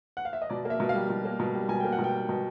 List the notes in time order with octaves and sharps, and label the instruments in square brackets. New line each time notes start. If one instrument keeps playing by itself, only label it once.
[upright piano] F#5
F5
E5
D#5
B2 D5
A#3
E5
B2
F5
G3
B2
A#3
B2
G3
B2 G#5
A#3 G5
F#5
B2
G5
G3
B2